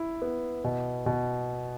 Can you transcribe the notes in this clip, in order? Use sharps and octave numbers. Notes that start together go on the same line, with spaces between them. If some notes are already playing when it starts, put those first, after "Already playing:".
Already playing: E4
B3
B2
B2